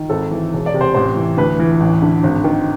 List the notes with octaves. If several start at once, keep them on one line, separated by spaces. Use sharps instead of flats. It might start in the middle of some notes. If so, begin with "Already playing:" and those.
Already playing: D#3
G#1 A4
E3
E1
D5
C3
C5
A1 C5
E3
D2 B4
E3
A1
D3
G#1
D#3